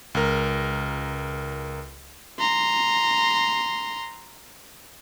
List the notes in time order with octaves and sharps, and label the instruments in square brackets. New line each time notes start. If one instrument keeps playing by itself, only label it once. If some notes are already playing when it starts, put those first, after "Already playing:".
[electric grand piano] C#2 A#4
[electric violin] A#5 C6